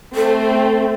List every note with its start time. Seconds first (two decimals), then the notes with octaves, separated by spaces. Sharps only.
0.15 A3 C4 A4